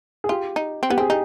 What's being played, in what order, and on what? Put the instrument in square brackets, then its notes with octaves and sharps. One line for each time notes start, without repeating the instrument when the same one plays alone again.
[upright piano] G#4
[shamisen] F4 [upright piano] G4
[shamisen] D#4
C4
[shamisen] B3 [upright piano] G4
[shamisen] C4 [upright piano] G#4
[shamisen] D#4 [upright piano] G4